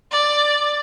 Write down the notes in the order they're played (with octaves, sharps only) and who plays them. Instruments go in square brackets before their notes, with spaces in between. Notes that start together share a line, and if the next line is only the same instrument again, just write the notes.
[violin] D5